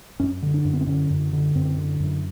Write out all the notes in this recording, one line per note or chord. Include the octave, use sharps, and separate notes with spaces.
F#2 C#4
D3
D4
F#2
B3
C4
D3 C#4
F#2
D3
F#2 C4
D3
F#2